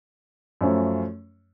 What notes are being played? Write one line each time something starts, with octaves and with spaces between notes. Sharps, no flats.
F#2 F3 A3 C#4